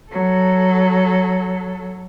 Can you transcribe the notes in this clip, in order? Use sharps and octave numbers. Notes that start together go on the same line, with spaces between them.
F#3 A4